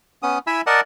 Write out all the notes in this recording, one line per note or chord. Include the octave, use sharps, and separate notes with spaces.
B3 C#4 D#6
E4 E5 G#5 B5 E6
A#4 D5 D#5 F#5 A5